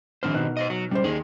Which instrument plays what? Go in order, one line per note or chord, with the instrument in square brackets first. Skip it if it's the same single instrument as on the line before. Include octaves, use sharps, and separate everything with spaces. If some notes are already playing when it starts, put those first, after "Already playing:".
[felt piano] A#1 F6 [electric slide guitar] D#3 C4 C5
[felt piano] B2 D#4 F#6
[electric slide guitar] C5 D5 D#5
F#3
[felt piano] C#2 C5 [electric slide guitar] G3
[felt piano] D#2 [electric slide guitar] A#3 G#4